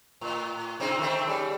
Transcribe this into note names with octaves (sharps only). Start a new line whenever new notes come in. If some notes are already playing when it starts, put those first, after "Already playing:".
A2
C3 C4 D#4
D#3 A3 C4
C#3 G3